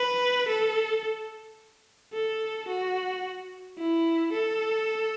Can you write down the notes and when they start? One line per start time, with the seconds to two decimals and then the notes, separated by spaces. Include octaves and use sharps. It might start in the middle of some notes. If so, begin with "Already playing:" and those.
Already playing: B4
0.48 A4
2.13 A4
2.68 F#4
3.78 E4
4.32 A4